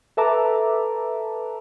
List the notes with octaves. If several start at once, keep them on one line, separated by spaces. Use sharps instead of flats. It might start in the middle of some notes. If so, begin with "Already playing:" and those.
A4 B4 E5 A5 A#5 D6